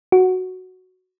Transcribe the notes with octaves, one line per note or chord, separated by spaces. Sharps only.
F#4